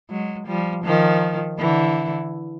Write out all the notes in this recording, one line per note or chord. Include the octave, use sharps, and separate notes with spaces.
F#3 G#3
F3 G3
D#3 F3
D3 E3